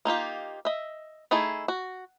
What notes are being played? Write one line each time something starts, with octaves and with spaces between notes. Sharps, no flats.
A#3 D#4 F4 G4
D#5 E5
A3 D#4 E4 G#4
F#4